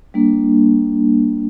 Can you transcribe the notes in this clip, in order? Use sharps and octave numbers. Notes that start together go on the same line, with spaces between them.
G3 A#3 D4